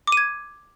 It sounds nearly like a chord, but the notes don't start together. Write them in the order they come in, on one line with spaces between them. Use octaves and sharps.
D6 D#7 G#6